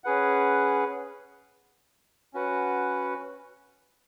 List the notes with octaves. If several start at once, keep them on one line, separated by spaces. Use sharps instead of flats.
C#4 G#4 B4 F#5
C#4 F#4 B4 F#5